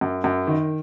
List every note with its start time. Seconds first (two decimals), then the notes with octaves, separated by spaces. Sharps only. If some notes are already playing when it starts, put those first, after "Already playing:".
0.01 F#2
0.24 F#2
0.47 D#3